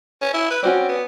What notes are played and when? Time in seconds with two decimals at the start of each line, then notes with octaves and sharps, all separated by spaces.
0.22 C#4
0.34 E4
0.50 B4
0.63 C4 C#4 F#4 D5
0.88 B3